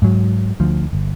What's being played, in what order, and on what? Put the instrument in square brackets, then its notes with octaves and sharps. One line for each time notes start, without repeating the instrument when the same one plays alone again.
[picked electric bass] G#2 F#3
D2 F3
G1